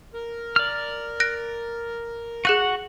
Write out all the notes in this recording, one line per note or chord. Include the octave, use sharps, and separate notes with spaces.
A#4
D5 F6
F#6 A#6 D7
F#4 G#4 F#5 F#6 D#7